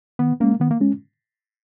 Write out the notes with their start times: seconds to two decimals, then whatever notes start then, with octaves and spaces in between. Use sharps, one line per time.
0.19 D#3 B3
0.40 G#3 A#3 C#4
0.60 D#3 B3
0.71 A#3
0.80 G#3 C#4